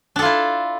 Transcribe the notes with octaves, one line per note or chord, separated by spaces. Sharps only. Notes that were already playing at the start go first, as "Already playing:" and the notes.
D4 E4 F4 A4